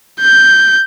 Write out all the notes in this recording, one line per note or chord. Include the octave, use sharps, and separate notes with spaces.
G6